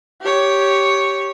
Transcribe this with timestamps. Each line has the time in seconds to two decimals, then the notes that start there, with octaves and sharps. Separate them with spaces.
0.21 G4 C#5